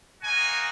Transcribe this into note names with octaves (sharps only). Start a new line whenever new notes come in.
A#3 D#4 F#4 G#5